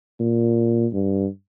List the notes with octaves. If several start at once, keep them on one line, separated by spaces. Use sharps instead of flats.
A#2
G2